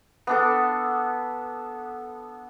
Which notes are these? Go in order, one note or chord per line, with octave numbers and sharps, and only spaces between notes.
B3 D4 A4